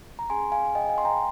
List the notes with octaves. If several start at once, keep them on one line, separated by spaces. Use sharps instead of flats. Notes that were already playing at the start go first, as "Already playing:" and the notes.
A#5
C#4 G#4 G#5 C6
F5 G#5
D#5 G5
F5 G#5
C6
G5 A#5